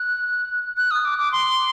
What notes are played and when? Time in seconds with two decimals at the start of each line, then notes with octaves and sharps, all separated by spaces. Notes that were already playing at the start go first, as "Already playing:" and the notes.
Already playing: F#6
0.77 F#6
0.91 D#6
1.05 D6
1.18 D6
1.32 C6